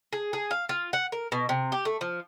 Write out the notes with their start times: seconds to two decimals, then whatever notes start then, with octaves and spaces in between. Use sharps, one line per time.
0.13 G#4
0.33 G#4
0.51 F5
0.69 F4
0.93 F#5
1.12 A#4
1.32 B2
1.49 C3
1.72 G4
1.85 A3
2.01 F3